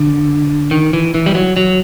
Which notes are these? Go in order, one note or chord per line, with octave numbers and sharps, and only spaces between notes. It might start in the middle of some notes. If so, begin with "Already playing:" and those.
Already playing: D3
D#3
E3
E3
G3
F#3
F#3